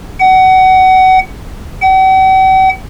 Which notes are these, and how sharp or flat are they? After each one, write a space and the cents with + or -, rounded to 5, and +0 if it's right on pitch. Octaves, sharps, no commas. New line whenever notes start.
F#5 +25
F#5 +45